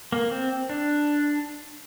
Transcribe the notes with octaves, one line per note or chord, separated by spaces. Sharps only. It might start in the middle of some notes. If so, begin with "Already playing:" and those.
A#3
C4
D4